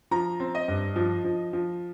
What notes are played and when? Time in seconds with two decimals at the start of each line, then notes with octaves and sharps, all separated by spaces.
0.11 F3 A#5
0.40 C4
0.55 D#5
0.68 G2
0.96 F3
1.24 F3
1.53 F3